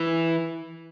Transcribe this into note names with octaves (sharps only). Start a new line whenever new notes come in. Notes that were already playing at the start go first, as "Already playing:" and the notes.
Already playing: E3